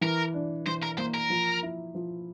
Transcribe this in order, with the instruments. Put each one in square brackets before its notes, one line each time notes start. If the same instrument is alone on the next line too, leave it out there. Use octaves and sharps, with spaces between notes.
[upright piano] E3 [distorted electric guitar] A#4
[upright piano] D4
[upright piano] E3 [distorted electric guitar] C5
[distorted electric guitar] A#4
[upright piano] A#3 [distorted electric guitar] C5
[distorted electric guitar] A#4
[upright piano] F3
E4
F3